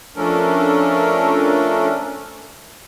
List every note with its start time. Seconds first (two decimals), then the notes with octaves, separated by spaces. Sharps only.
0.16 F3 A3 C#4 D4 A4 A#4